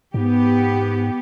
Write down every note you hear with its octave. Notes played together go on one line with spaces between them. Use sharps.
G#2 B3 G4